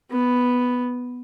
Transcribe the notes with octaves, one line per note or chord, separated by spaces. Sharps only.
B3